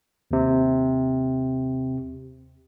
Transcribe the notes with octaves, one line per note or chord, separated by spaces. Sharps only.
D#2 C3